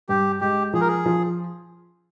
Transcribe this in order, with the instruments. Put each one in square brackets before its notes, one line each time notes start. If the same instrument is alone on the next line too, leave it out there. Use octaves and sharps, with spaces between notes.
[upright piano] G2 [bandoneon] G4
[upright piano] G#3 [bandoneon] G4
[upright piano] F3 [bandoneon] G#4
[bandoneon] A#4
G#4
[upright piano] F3